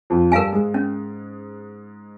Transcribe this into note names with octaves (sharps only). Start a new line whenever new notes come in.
F2 F3
G2 G3 A#4 F5 G#5
G#2 G#3
C#4